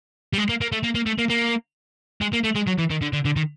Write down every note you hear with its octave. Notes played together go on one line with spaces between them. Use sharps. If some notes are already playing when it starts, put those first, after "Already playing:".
G3
G#3
A#3
A#3
A3
A#3
A#3
A3
A#3
A#3
G#3
A#3
A3
G#3
F#3
E3
D#3
D3
D3
D3
D#3